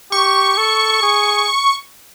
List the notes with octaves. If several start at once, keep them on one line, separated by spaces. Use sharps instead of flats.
G4 C#6
A4
G#4